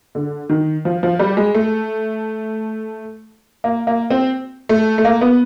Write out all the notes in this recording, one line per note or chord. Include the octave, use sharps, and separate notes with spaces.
D3
D#3
F3
F3
G3
G#3
A3
A#3
A#3
C4
A3
A3
A#3
B3